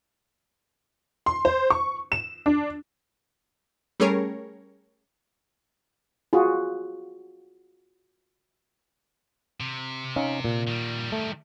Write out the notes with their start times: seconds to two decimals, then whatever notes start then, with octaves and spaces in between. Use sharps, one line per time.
1.26 C6
1.45 C5
1.70 C#6
2.12 E7
2.46 D4
4.00 G3 A3 C#4 G#4 A#4 C#5
6.33 F4 F#4 G#4
9.60 C3
10.16 C#4 D#4 F5
10.44 A#2
10.67 D#3 G3
11.12 A3